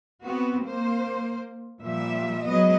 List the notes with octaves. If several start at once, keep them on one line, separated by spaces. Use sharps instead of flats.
B3 C4 F#4
A#3 C5
A#2 F3 G3 E5
F#3 G#3 B3 D#5